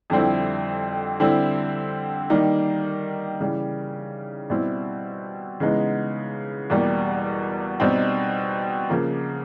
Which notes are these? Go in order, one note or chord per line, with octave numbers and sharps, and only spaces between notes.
F2 D3 G3 C4 E4
D3 G3 C4 E4
D#3 G3 A#3 D#4
C#3 E3 G3
B2 G3 C4 E4
C#3 E3 G#3 B3 D#4
E2 B2 G3 A#3
B2 G3 C4 D#4
C#3 F3 A#3